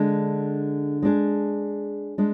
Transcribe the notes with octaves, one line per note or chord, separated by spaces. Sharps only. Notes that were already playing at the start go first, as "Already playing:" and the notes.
Already playing: D3 G#3 D4
G#3 D4 G#4
G#3 D4